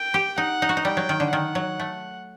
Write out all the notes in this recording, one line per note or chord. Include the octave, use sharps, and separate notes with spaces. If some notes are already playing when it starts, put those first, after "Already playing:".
Already playing: G5
G4
D#4 F#5
D#4
F#4
D#4
G3 G5
F#3
D#3
D3
D#3 F#5
F#3
A3